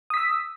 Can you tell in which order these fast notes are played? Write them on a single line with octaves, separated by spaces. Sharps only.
D#6 B6 E6